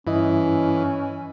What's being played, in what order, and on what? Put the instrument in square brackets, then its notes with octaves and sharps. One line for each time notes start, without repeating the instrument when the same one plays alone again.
[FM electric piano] G2 E4 D#5 [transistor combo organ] E3 [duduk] C#4